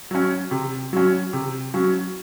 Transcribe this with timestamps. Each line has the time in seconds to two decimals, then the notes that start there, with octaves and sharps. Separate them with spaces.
0.11 F#3 C#4
0.51 C3
0.93 F#3 C#4
1.33 C3
1.74 F#3 C#4